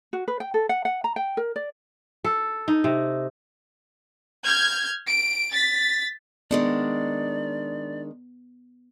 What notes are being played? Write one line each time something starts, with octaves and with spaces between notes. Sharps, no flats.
F#4
B4
G5
A4
F#5
F#5
A#5
G5
A#4
D5
A4
D#4
C3
F6 G6 G#6
D7
A6 B6
D#3 G#3 B3 D4 D5